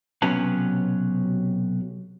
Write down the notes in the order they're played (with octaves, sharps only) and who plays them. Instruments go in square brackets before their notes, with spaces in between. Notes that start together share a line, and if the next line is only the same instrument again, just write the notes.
[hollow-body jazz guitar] B1 C3 F#3 B3 C#4 A5